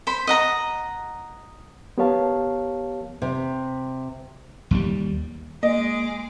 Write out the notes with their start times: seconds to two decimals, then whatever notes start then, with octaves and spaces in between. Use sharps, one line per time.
0.07 C5 B5
0.27 D#5 F#5 A#5
1.98 B3 G4 A#4 C#5 F5 A5
3.22 C3
4.71 D#2 G3
5.63 G#3 A#3 G#4 D#5 D6